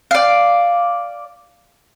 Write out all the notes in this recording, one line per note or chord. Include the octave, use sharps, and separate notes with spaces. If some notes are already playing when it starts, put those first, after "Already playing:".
D5 F5